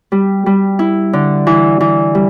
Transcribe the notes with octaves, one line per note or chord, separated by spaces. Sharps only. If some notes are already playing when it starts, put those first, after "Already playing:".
G3
G3
E4
D3
E3
E3
G3